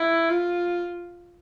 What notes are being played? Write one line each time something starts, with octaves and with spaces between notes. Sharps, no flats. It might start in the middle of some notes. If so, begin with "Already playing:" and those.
Already playing: E4
F4